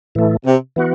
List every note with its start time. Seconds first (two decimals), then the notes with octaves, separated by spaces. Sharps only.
0.15 A2 E3 A3
0.45 C3
0.76 E3 B3 F#4